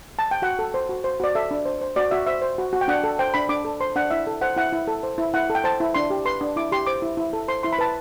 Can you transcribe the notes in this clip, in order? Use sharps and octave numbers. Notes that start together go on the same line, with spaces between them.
A5
G5
F#4 F#5
A4
C5
F#4
C5
F#4 D5
A4 E5
D4
C5
C5
F#4 D5
F#4 E5
C5 E5
C5
F#4
F#4
G5
D4 F#5
A4
C5 G5
D4 B5
D4 D6
A4
C5 C6
D4 F#5
E4 E5
A4
C5 F#5
E4 F#5
E4
A4
C5
E4
E4 F#5
A4
G5
C5 A5
E4
D4 C6
G4
B4 C6
D4
E4 D6
G4 C6
C5 D6
E4
E4
A4
C5 C6
E4 C6
B5
B4 A5